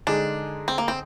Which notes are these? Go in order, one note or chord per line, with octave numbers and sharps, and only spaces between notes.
D3 G#3 D4 D#4 G#4
C4
A#3
C4